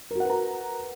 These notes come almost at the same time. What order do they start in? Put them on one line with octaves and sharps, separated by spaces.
A#4 F#4 F#5 B4 A#5